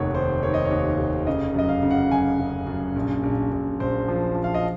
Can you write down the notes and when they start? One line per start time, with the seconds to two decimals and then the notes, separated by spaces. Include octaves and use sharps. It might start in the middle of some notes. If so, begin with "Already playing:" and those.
Already playing: F1 D#2 C#5 F#5
0.14 D#3 C5
0.43 D#3 C#5
0.54 D#5
0.65 C#5
0.71 D#2
0.98 F1
1.27 C#3 D#5
1.54 F#2 D#5
1.69 F5
1.83 C#3
1.91 F#5
2.11 F#2 G#5
2.40 C#3
2.67 F#2
2.96 A#1
3.23 A#1
3.52 A#1
3.80 A#1 C5
4.08 F3
4.35 F3
4.44 F5
4.54 D#5